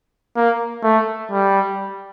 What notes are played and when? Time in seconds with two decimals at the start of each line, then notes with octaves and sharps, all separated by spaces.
0.37 A#3
0.84 A3
1.32 G3